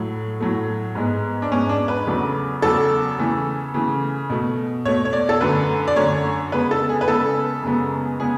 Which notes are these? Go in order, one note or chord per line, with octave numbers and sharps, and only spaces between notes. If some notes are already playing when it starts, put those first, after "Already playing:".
Already playing: A2 F#3 A3
A2 F#3 A3
G#2 G#3 B3
D4
G#2 G#3 B3 C#4
D4
B4
E2 C#3 F#3 A3
E2 C#3 F#3 A3 A4
C#3 E3 A3
C#3 E3 A3
B2 A3
B2 A3 C#5
C#5
D5
A4
F#2 D3 A3 B4
D5
F#2 D3 A3 C#5
C#3 G#3 B3 B4
A4
G#4
B4
C#3 G#3 B3 A4
F#2 C#3 G#3 B3
C#3 G#3 B3 G#4